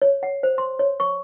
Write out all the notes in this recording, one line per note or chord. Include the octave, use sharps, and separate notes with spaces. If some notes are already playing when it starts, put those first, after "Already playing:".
C#5
F#5
C5
C6
C#5
C#6